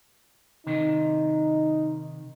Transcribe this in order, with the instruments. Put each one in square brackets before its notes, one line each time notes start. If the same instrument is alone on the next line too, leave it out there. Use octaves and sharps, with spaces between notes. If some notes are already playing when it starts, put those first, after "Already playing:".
[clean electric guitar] C3 D#3 [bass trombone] D#4